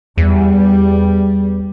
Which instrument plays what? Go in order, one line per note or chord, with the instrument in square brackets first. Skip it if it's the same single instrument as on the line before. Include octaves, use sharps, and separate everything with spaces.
[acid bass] E2 [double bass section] G3